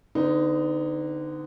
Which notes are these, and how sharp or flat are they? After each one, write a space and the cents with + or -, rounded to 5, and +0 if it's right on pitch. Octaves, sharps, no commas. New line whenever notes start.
D3 +0 B3 +45 D#4 +0